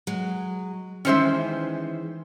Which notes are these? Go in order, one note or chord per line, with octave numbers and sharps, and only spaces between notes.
F#3 G#3
D#3 E3 G#3 C#4 C5 E5